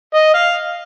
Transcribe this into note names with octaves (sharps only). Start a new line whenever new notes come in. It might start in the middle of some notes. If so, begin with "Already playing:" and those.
D#5
F5